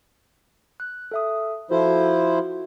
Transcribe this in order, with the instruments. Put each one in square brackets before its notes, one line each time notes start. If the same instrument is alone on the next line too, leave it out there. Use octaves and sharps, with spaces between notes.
[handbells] F#6
A4 E5 D#6
[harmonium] F3 E4 C5 [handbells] F#4 A4
[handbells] F#4